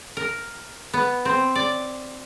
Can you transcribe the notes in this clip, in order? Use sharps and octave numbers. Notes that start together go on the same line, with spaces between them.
A#4
B3
C4
D5